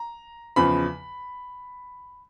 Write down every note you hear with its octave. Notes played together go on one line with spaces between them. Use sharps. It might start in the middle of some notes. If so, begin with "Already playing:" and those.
Already playing: A#5
E2 C#3 F3 B5